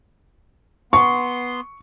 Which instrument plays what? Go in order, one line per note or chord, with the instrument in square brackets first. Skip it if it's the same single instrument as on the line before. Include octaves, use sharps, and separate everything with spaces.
[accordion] B3 C6 [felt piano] C#6